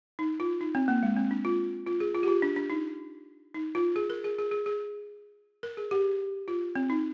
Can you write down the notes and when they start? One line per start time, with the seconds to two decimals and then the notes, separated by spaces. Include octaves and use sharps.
0.19 D#4
0.40 F4
0.61 D#4
0.75 C4
0.88 A#3
1.03 G#3
1.17 C4
1.31 D4
1.45 F4
1.87 F4
2.00 G#4
2.15 F4
2.23 G4
2.28 F4
2.42 D4
2.56 D4
2.70 D#4
3.54 D#4
3.75 F4
3.96 G#4
4.10 A#4
4.24 G#4
4.39 G#4
4.51 G#4
4.66 G#4
5.63 A#4
5.77 G#4
5.91 G4
6.48 F4
6.75 C4
6.90 D#4